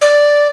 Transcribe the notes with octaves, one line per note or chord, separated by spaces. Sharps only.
D5